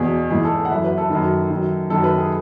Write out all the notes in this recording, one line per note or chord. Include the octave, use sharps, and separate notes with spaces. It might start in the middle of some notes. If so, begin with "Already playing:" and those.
Already playing: E2 B2 G#4
G#2 E3 G#4
A4
F#5
F#2 E3 E5
B4
A4
F#2 D#3
F#2 D#3
F#2 D#3 A4
B4
G#4